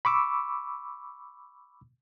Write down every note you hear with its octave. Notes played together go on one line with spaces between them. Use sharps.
B5 C#6 D6 E6